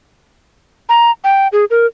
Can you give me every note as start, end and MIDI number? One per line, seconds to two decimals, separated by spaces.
0.89 1.11 82
1.24 1.48 79
1.52 1.65 68
1.70 1.86 70